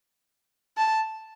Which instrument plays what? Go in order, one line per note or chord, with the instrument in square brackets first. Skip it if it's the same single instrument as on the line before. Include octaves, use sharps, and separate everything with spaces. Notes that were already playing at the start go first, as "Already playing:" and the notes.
[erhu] A5